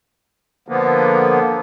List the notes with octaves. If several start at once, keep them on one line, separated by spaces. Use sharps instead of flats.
D3 F3 A#3 B3